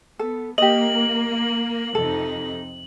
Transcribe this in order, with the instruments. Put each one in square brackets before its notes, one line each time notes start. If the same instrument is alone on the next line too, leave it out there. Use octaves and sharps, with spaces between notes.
[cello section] B3 [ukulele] A4
[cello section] A#3 [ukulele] G4 D#5 [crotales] F#7
[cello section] F2 C3 D#4 [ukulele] A4